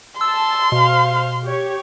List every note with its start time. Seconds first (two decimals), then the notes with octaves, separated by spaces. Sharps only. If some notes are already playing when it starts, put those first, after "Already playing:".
0.21 A5 C6 E6
0.72 B2 C5 F5
1.43 G4 C#5